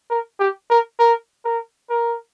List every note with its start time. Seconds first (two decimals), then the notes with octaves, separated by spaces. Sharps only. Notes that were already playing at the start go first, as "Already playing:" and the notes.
0.10 A#4
0.40 G4
0.70 A#4
0.99 A#4
1.45 A#4
1.90 A#4